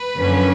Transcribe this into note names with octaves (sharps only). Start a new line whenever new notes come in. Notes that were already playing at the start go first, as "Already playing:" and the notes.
Already playing: B4
F#2 D3 F3 A#3 C#4